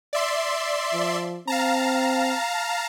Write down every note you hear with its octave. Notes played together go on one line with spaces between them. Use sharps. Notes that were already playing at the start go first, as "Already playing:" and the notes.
D5 E5 C6
F3
C4 F5 A5 A#5